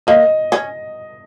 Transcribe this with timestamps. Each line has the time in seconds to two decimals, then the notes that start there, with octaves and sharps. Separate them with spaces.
0.07 A#3 D#5
0.52 C#4